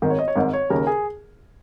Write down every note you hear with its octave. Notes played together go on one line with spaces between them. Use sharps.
G#1 G#2 D#3
C#5
D#5
C#5
G#1 G#2 D#3
C#5
D#2 C#3 A#4
G#4